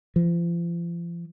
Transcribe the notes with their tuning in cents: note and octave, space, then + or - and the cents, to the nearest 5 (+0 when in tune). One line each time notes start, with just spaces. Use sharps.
F3 -40